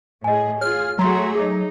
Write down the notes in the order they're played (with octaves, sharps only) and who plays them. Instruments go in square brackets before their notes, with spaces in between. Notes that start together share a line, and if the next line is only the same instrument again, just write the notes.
[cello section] A2 G#4 [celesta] D#5 G#5
[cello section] F4 G#4 [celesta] C#5 [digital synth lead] F6
[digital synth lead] F#3 [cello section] A3 F#4 G#4 [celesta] A#5 C6
[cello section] D#4 [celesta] G#4